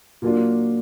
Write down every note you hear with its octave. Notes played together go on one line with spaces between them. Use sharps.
A#2 F#3 A#3 D4 F4